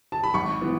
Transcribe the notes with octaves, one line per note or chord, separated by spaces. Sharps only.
A5
B5
G#1 C#6
E3 B3